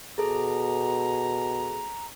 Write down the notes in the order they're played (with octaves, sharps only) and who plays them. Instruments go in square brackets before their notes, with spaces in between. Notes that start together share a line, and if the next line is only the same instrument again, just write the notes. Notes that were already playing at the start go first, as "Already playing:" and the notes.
[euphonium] B2 [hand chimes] G#4 A4 [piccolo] A#5